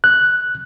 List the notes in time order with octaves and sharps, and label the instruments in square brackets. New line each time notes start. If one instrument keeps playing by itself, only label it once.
[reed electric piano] F#6